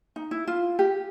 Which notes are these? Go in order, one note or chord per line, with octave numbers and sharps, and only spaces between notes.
D#4
E4
F4
G4